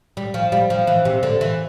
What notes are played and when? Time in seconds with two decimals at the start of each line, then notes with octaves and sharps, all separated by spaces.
0.17 G3
0.34 F3
0.52 G3
0.70 F3
0.87 E3
1.05 C3
1.23 D3
1.41 E3